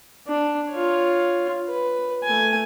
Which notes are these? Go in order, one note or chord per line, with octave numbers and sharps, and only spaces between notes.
D4
F4 C#5
B4
A3 G#5